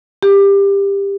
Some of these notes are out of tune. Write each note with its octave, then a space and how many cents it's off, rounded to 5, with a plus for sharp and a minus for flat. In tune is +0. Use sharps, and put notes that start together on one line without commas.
G4 +20